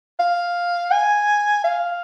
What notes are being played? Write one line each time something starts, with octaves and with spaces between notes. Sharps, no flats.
F5
G#5
F5